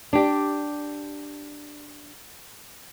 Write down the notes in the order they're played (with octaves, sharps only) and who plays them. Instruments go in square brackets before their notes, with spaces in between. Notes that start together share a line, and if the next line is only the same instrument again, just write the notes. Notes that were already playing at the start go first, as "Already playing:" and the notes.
[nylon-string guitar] D4 G4